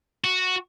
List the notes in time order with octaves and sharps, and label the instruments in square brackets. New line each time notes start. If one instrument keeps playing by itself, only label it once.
[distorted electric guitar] F#4